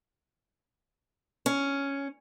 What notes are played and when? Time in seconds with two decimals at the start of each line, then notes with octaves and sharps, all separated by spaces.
1.46 C#4